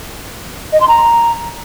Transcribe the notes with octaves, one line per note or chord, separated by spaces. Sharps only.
D#5
C6
A#5